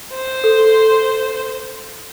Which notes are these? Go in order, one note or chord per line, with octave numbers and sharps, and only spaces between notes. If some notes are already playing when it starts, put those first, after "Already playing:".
C5
A4